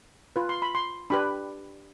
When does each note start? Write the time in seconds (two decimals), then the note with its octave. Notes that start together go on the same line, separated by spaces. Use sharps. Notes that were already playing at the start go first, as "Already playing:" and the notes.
0.36 F4 B4
0.49 C6
0.62 B5
0.75 C6
1.10 D4 G4 B4 B5